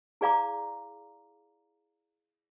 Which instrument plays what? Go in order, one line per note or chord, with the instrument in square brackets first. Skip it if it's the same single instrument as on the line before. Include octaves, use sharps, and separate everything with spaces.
[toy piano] E4 G#4 D5 F5 A#5 D6